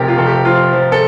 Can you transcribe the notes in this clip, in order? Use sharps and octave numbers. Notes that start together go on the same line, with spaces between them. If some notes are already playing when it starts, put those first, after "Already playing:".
Already playing: F1 C3 F3 G4 A#4
F4
F1 A4
G4
F3 F4
F3
A4